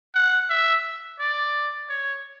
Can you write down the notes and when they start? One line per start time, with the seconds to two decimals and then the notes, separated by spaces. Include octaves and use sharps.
0.15 F#5
0.50 E5
1.20 D5
1.89 C#5